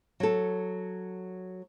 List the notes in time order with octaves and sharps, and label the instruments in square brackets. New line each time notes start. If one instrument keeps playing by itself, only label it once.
[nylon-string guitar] F#3 A4